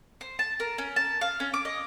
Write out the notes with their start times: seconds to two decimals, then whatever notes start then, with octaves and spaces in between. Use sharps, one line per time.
0.21 C5
0.39 A5
0.60 A#4
0.78 C#4
0.96 A5
1.21 F5
1.40 C#4
1.54 D6
1.65 D#5